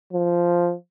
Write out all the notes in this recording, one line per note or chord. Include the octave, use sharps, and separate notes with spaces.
F3